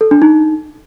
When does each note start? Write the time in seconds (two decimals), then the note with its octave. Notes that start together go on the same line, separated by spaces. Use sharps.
0.01 A4
0.11 D4
0.22 D#4